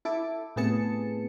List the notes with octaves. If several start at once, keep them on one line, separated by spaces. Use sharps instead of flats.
E4 A4 D6
A2 C3 B3 G#4 A5 C#7